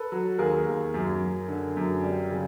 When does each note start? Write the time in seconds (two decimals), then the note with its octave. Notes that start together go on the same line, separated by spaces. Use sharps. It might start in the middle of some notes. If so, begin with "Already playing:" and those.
Already playing: A4 B4
0.12 F#3
0.39 D#2 G#4 A#4
0.67 D#2
0.94 F#2
1.21 F#2
1.48 D3
1.77 F#2
2.03 G3
2.31 C#3